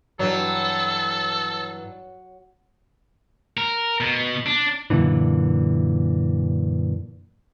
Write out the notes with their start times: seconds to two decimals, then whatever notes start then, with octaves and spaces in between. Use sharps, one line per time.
0.19 G2 E3 F#3 A4
3.57 A#4
4.00 B2
4.46 D4
4.90 F#2 A#2 D3 E3